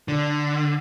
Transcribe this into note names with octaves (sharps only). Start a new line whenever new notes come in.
D3